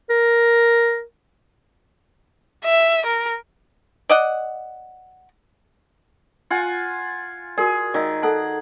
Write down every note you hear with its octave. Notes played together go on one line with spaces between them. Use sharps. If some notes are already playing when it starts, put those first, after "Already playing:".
A#4
E5
A#4
D5 D#5 F#5
F4 F#5 G#5
F#4 G#4 A#4 D5
D#3 D5 F5 E6
A4 F#5 A5